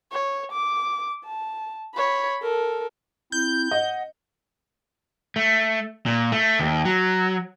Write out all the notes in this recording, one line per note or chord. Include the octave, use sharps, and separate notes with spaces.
C#5
D6
A5
C#5 B5
A4 A#4
C4 E4 G6
D#5 F#5
A3
A#2
A3
D#2
F#3